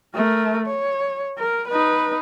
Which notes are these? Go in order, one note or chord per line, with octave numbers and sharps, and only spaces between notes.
A3 A#4
C#5
A#4
D#4 B4